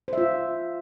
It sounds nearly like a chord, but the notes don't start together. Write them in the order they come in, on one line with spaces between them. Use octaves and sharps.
C5 E5 F4